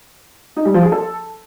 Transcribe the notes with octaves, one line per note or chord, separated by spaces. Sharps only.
D#4
G3
F3
G#4
A4